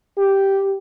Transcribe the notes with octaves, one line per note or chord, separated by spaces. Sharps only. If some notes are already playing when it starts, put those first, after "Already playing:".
G4